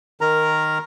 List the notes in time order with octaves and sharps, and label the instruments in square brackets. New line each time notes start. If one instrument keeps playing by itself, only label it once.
[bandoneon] D#3 A#4 A#5